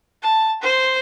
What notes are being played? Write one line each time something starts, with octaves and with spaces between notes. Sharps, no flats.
A5
C5